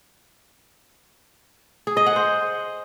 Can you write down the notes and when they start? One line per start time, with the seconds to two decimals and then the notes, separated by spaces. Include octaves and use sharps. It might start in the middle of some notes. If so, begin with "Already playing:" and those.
1.87 G#4
1.97 D#5
2.06 F#5
2.16 C5